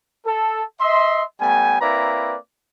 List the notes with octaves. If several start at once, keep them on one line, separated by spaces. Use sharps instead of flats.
A4
D#5 E5 C6
G3 A3 B3 G5 G#5
A#3 C4 E4 B4 D5 A#5